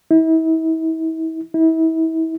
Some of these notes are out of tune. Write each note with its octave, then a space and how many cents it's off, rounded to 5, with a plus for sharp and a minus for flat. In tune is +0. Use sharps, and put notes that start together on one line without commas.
E4 -40
E4 -35